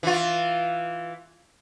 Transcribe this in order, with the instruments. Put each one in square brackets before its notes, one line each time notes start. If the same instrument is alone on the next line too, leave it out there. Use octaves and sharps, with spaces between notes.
[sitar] E3 F4